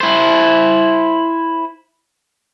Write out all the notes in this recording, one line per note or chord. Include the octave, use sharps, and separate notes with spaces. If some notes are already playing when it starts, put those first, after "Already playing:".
E4 C5